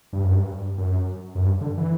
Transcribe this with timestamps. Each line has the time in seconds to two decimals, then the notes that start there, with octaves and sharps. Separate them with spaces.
0.13 G2
0.23 F#2
0.33 G2
0.78 F#2
1.35 F#2
1.44 G2
1.61 D3
1.78 E3